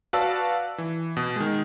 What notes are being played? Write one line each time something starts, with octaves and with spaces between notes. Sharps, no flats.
F#4 B4 D5 F5 A5 E6
E3
B2
D#3 G#3